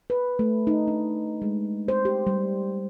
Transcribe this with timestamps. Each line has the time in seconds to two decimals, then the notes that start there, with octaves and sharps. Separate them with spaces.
0.10 B4
0.39 A3
0.67 D#4
0.88 D4
1.42 G#3
1.88 C5
2.05 G4
2.27 G3